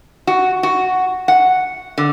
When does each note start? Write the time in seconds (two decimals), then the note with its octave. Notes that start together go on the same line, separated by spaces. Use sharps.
0.27 F#4
0.63 F#4
1.28 F#5
1.98 D3